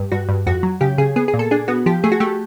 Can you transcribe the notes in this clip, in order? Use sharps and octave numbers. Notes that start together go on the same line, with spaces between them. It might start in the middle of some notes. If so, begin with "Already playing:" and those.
Already playing: G2
G2 F#4
G2
F2 F#4
F#3
C#3 G4
C#3 G#4
B3 G#4
G#4
A#2
A4
D4 G#4
B3 F#4
F3 G4
A3 G#4
F#4
A3 G4